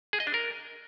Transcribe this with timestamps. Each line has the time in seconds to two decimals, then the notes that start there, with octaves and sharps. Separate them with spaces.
0.13 G#4
0.20 D#5
0.27 D4
0.34 A#4